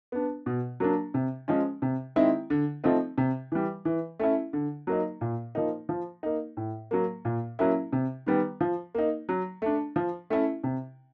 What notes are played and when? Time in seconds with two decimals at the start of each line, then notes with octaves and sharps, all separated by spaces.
0.12 B3 D4
0.46 B2
0.80 F#3 A#3 D4
1.14 C3
1.48 F3 G#3 C#4
1.82 C3
2.16 D#3 G#3 C4 E4
2.50 D3
2.84 F3 A3 C4 D#4
3.18 C3
3.52 E3 G3
3.85 E3
4.19 A3 C#4 E4
4.53 D3
4.87 F#3 A#3 D#4
5.21 A#2
5.55 F3 A#3 D#4
5.89 F3
6.23 A#3 D#4
6.57 A2
6.91 F#3 A#3
7.25 A#2
7.59 F#3 A#3 C#4 E4
7.93 C3
8.26 D#3 G3 B3
8.61 F3
8.95 A#3 D#4
9.29 F#3
9.62 A3 D4
9.96 F3
10.30 A3 C#4 E4
10.64 C3